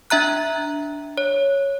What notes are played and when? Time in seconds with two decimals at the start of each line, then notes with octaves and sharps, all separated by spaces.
0.10 D4 E5 A#5 F#6
1.18 C#5